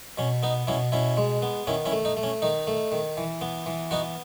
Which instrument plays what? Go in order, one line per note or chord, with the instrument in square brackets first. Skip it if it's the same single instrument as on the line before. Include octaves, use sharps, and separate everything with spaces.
[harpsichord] B2 C#4
B3 D#4
B2 C#4 E4
B2 C#4 E4
G#3
B3
D#3 C#4 E4
C#4 E4
A3
D#4
A3
C#4
D#3 D#4
A3
D#3
E3
B3
E3
B3 D#4 F#4